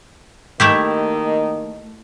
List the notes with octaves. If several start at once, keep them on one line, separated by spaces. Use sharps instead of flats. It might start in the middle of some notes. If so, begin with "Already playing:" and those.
D#3 A3 A#3 E4 G4 D#5